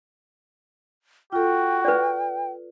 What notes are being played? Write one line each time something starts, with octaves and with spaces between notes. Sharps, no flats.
F4 F#4 A4 G5
B4 D5